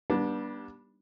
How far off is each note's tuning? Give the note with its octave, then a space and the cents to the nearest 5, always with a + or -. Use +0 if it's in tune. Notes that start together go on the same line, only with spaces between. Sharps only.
G3 +0 B3 -35 D4 +0